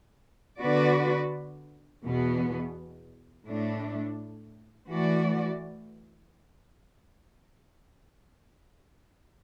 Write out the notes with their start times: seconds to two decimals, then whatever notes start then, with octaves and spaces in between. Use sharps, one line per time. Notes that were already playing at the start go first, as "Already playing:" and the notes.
0.60 D3 B3 F#4 B4 D5
2.04 E2 B2 B3
3.46 A2 A3 D4
4.90 E3 A3 F#4 D5